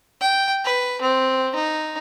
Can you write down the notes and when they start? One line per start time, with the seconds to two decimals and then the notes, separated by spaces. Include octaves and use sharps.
0.21 G5
0.65 B4
1.01 C4
1.55 D#4